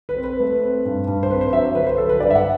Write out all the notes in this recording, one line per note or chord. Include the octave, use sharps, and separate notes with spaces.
B4
C4
B4
A3
C4
G2
G2
C5
C4 B4
C5
F#3 E5
D3 B4
C5
F#3 A4
B4
G2 D5
E5
F#5